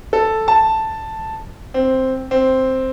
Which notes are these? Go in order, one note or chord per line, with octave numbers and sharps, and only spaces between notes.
A4
A5
C4
C4